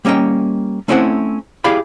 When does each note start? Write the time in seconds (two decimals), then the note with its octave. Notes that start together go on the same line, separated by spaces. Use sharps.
0.05 G3 A#3 C#4 D#5 G5
0.88 A3 C4 C#4 E4 C5 F#5
1.64 E4 G4 G#4 D5 F5 B5